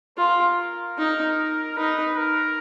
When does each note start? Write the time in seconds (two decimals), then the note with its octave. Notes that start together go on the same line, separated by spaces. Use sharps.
0.18 F4 A#4
0.98 D#4
1.77 D#4 B4
2.18 A#4